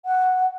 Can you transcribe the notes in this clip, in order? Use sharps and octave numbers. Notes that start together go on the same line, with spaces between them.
F#5